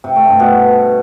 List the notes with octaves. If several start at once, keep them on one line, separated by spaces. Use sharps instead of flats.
C3
A3
G2
B2